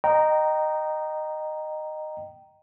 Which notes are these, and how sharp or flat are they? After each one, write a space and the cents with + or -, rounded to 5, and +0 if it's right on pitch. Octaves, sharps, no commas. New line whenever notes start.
D#5 -15 G5 -15 A#5 +0